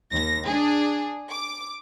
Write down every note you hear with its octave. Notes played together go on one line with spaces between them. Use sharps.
D#2 A#6
D4 G#4
D6